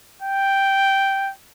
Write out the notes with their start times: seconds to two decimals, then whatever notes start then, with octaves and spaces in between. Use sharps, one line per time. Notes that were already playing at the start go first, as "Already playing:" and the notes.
0.22 G5